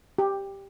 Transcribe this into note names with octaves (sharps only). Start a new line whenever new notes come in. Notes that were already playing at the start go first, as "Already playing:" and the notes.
G4